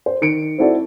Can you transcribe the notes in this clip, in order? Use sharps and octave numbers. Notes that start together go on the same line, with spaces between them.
C5
D#3 C#7 D7
C4 D#4 E4 F#4 A4 D5